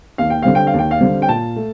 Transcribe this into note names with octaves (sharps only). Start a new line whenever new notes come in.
D#2 F5
G5
D3 G3 C4 F5
G5
F5
D#2 G5
F5
D3 G3 C4
G5
A#2 A5
A3